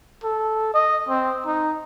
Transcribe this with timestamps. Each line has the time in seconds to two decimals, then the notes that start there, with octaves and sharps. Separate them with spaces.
0.24 A4
0.74 D#5
1.09 C4
1.46 D#4